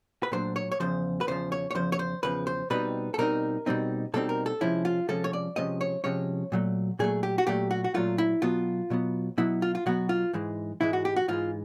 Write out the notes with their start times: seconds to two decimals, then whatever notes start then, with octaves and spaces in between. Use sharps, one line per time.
0.23 B4
0.32 A#2 F#3 A3 D4 C5
0.56 C#5
0.72 C#5
0.80 E2 C#3 F3 C5
1.21 B4
1.27 E2 C#3 F3 C5
1.52 C#5
1.71 C#5
1.75 E2 C#3 F3 C5
1.92 C#5
1.99 C5
2.23 E2 C#3 F3 B4
2.47 C5
2.70 B2 G3 C4 D#4 B4
3.14 A4
3.18 B2 G3 C4 D#4 A#4
3.66 B2 G3 C4 D#4
4.14 B2 G3 C4 D#4 A4
4.29 A#4
4.46 A4
4.61 C3 F3 G#3 C#4 E4
4.85 F4
5.08 C3 F3 G#3 C#4 A4
5.24 C#5
5.33 D5
5.56 C3 F3 G#3 C#4 D#5
5.81 C#5
6.04 C3 F3 G#3 C#4 C#5
6.52 A#2 F#3 A3
6.99 A#2 F#3 A3 G#4
7.23 G4
7.38 F#4
7.47 A#2 F#3 A3 G4
7.71 F#4
7.84 F#4
7.94 A#2 F#3 A3 F4
8.18 E4
8.42 B2 F#3 B3 F4
8.90 B2 F#3 B3
9.38 B2 F#3 B3 E4
9.62 F4
9.75 F4
9.86 B2 F#3 B3 F#4
10.09 F4
10.33 G#2 E3 G#3
10.81 G#2 E3 G#3 E4
10.93 F#4
11.05 G4
11.16 F#4
11.28 G#2 E3 G#3 F4